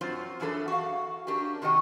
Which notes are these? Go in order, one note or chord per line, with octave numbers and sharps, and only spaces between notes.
F#2 F#3 C4 F4 C5
F#2 E3 D4 G#4 A4 E5
F#4 F5
C#4 D4 G4 A#4
C3 D#3 F#4 G4 D#5 G5